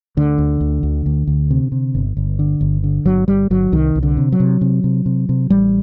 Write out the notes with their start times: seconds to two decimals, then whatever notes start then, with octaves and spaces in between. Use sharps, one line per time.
0.17 D2 D3
0.38 D2
0.60 D2
0.83 D2
1.06 D2
1.27 D2
1.51 C3
1.72 C3
1.95 G1
2.17 G1
2.39 D3
2.61 G1
2.84 D3
3.05 G1 F#3
3.28 G1 G3
3.50 G1 F#3
3.72 C2 D#3
3.95 C2
4.03 D3
4.17 C3
4.32 F#3
4.40 C3
4.61 C3
4.84 C3
5.06 C3
5.29 C3
5.50 A1 G3